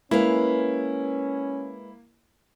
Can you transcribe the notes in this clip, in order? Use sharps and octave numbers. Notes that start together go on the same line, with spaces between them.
G#3 A#3 C#4 E4 B4 F5